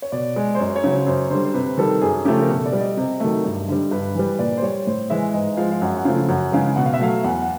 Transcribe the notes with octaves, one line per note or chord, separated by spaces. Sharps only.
C#5
B2 D5
G#3
C5
F#2 C#5
C5
C#5
C#3 F#3
C5
F#2 C5
D3 G3 C5
C5
C3 B4
D#3 G3 A4
F#2 G#4
C#3 F3 A3 G4
A#4
B2 A4
D5
G3
D#5
C3
D#3 F#3 A3
G2
D3 G3
G2 B4
E3 G3
A#2 D5
C5
G3 C#5
A2 C5
E3 G#3 E5
G#2 D#5
F3 G#3 F5
F5
F#2 F#5
F#5
C#3 F3 A3 F5
F#2 F#5
C#3 E3 G#3 F5
B2 F#5
F5
E5
F#3 A3 F5
E2 F#5
F#5